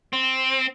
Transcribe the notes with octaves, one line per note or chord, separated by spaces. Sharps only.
C4